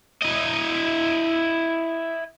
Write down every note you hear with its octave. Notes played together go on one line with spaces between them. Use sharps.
E4 D#5